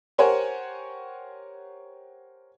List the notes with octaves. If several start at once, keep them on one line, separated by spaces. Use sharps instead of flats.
G4 A#4 C5 C#5 F#5 G#5